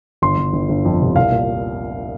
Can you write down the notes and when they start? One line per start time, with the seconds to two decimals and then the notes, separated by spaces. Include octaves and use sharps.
0.22 G1 C6
0.37 G1
0.53 G1
0.69 G1
0.85 F2
1.01 C3
1.16 C2 F5
1.31 A#2